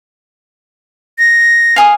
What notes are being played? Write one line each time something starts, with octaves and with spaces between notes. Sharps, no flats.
A#6
F5 G#5 D#6